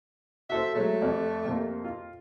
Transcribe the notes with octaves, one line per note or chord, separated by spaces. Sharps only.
F#4 A4 C5 E5
F#3 G#3 A3
F2 G4 D5
F2 C3 A#3
F4